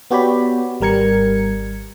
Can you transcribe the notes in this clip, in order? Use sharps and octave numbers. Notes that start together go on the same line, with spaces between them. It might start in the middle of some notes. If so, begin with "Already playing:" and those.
B3 F#4 G4 C#5 D5 B5
G#1 G3 A#4 G#6 C#7